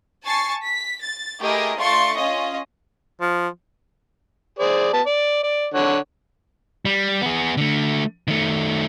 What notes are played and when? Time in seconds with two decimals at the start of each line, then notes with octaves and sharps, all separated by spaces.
0.24 G#5 A5 C#6 A6 C7
0.62 B6
1.02 A6
1.39 A3 E4 G4 G#4 A#4 D#5
1.76 A3 D4 F4 C6 C#6 A6
2.15 C#4 F4 D#5
3.21 F3
4.59 G#4 C5 D5
4.93 B3 A5
5.06 D5
5.43 D5
5.74 D3 C#5 F#5
6.85 G3
7.22 B3 G#4
7.57 D3 A3
8.28 D#3 A3